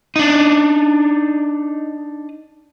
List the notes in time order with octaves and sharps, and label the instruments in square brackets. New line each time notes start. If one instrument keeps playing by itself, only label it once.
[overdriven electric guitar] D4 D#4